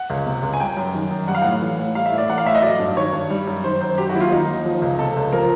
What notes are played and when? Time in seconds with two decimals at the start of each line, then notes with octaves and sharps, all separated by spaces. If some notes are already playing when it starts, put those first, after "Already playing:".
Already playing: F#5
0.10 C#2
0.26 C3
0.43 C#2
0.54 G#5
0.60 G3 G5
0.77 F#2
0.94 D#3
1.11 F#2
1.27 G3 F#5
1.35 F5
1.42 A2 F#5
1.61 E3
1.78 A2
1.95 G3 F5
2.06 E5
2.12 A2
2.18 D5
2.29 E3 F#5
2.38 F5
2.45 A2 E5
2.55 D#5
2.63 F#3 D5
2.79 G2
2.97 D#3 C#5
3.13 G2
3.30 G3
3.47 F#2
3.64 D#3 C5
3.81 F#2 C5
3.98 F#3 G4
4.09 F#4
4.15 D#2 E4
4.20 F4
4.31 D#3 D#4
4.48 D#2
4.65 F3
4.82 C#2
4.99 C3 A4
5.16 C#2
5.33 F3 A#4